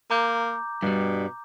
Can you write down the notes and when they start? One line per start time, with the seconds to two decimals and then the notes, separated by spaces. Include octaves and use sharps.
0.10 A#3 A#5 D6 G6
0.82 G2 B2 G3